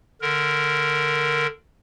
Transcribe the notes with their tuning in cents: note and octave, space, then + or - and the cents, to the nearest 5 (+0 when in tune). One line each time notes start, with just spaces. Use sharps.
D3 +10 A#4 +0